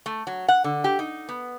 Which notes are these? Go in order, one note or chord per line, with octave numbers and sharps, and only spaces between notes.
A3
F#3
F#5
D3
G4
D#4
B3